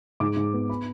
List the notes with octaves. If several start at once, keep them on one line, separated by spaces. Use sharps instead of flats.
G#2 D6
G#2
B3
B5